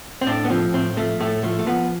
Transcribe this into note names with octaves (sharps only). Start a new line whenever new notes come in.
C4
A2 D4
B3
F3 C4
A2 C4
F3 A3
A2 A3
F3 A3
A3
F3 B3